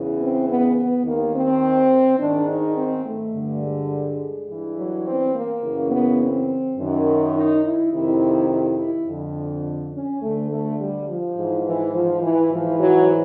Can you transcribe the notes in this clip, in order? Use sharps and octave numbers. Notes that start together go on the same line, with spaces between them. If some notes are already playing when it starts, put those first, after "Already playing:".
Already playing: E2 C#3 E3
C4
B3
B3
D#2 D#3 A#3
C4
G#2 D#3 D4
D#4
C4
A3
G2 D3
G#3
G2 E3
F#3
C4
A#3
F#2 C#3 E3
B3
C4
F#2 D#3
D#4
E4
F2 C3 D#3 E4
E4
E4
F2 D3
C#4
D2 D3 A3
A3
G3
F3
G#2 E3
E3
F3
E3
G#2 E3 F3
F#3